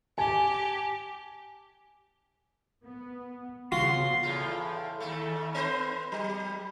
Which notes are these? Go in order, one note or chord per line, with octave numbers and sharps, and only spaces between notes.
G4 G#5 A5
B3
C#3 B3 F4 F#4 C6
E2 A2 F4
D#2 A3
B3 B4 C5
F#3